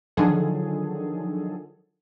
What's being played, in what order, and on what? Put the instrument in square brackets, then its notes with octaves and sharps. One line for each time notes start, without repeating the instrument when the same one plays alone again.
[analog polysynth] D3 D#3 F3 F#3 G#4 A4